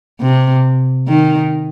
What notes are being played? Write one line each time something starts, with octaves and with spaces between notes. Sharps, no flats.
C3
D#3